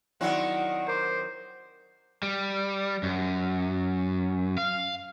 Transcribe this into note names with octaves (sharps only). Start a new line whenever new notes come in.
D#3 F#3 C4 E4 D5 F#5 F#6
A#4 C5 D6
G3
F#2
F5